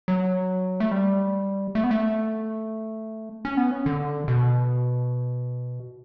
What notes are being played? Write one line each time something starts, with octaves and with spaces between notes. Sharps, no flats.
F#3
A3
G3
A3
B3
A3
C#4
B3
C#4
D3
B2